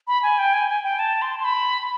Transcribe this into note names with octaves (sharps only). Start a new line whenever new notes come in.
B5
G#5
G5
G#5
G#5
G5
A5
C6
C6
B5